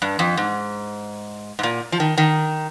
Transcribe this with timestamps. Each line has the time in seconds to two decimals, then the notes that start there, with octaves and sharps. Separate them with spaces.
0.02 G2
0.19 F2
0.37 G#2
1.59 G#2
1.63 A#2
1.92 F3
2.00 D#3
2.18 D#3